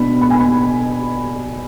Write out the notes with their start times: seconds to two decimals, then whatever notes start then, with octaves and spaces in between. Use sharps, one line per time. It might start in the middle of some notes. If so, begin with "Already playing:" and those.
Already playing: B2 B3 D4 B5
0.21 B5
0.30 G#5
0.39 B5